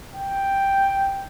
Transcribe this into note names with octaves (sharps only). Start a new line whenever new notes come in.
G5